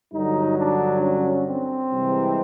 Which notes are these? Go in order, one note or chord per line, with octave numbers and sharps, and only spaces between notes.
G2 D3 F#3 D#4
D4
C#4
C4
C2 C3 E3 G#3